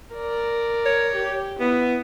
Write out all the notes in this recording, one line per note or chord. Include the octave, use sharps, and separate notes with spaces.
A#4 D5
C#5
G4
B3 E4